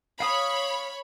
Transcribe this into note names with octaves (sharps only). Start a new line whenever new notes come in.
C#5 F5 B5 D#6